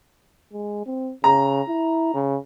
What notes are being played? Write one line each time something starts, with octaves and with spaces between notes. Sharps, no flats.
G#3
C4
C#3 A#5
E4
C#3